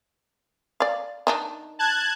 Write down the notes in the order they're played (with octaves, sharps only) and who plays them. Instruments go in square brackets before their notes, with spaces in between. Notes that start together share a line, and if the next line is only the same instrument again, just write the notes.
[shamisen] D5 F5
D#3 D4 D#4
[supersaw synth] A5 F#6 G#6